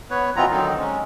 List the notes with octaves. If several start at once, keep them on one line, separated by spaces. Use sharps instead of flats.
B3 B4 C#5
B2 E3 B3 C4 F4 A#5
D3 D#3 F#3 C4 D#4
G#3 C#4